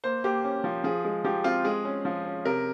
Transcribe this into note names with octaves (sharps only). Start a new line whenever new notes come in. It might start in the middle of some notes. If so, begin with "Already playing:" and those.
A#3 C5
A#3 G4
C#4
F3
F3 G#4
G#3
F3 G4
C4 F4
G#3 G#4
C#4
F3
C#4
C3 A#4